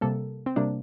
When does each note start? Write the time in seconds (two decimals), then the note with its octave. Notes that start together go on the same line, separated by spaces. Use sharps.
0.01 C3 G3 A#3 A4
0.46 C4
0.56 C3 G3 A#3 D4